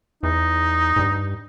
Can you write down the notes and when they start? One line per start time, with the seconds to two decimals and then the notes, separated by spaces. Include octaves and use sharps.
0.23 E2 D#4
0.96 G#2
0.99 G2